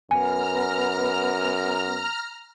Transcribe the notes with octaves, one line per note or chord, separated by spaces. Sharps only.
F#2 B3 G#5 A#5 F6